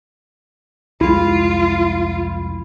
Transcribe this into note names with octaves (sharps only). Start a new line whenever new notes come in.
C2 F2 G#3 E4 F4